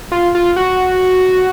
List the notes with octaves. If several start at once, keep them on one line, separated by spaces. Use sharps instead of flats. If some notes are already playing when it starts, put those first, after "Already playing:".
F4
F4
F#4